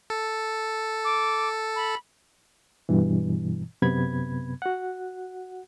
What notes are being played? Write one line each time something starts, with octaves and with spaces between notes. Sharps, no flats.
A4
D6
B5
G2 B2 E3
F#2 C3 B3 B5 G#6
F#4 F#5